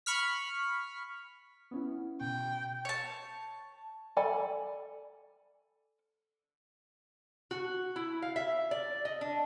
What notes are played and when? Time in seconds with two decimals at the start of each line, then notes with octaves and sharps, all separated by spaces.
0.06 B5 C#6 F6 B6
1.71 B3 C#4 E4
2.21 B2 G5
2.85 C#5 A5
4.17 A4 D5 G#5 B5
7.51 F#4
7.96 E4
8.22 F5
8.36 E5
8.71 D5
9.05 D#5
9.21 D4